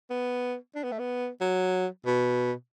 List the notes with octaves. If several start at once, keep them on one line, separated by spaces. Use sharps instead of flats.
B3
D4
B3
A3
B3
F#3
B2